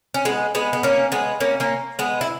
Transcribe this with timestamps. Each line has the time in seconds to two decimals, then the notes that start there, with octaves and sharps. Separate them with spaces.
0.14 C#4
0.25 G#3 B3
0.55 G#3 B3
0.73 B3
0.83 A#3 C#4
1.12 G#3 B3
1.40 A#3 C#4
1.60 A#3 C#4
1.99 G#3 B3
2.21 E4